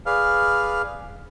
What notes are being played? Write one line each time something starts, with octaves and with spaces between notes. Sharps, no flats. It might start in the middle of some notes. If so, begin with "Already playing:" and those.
G#4 B4 D5 F5 F6